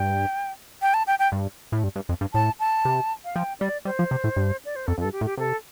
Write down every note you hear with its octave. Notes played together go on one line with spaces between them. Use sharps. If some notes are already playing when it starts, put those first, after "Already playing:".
Already playing: G2 G5
G5
A5
G5
G5
G2
A2
G2
G2
F2
G2
A2 A5
A5
C3
F5
F3 G5
G3 D5
G3 C5
F3
C3
A2
G2
D5
C5
F2 A4
F2 A4
G2
G4
A2
G4
C3 A4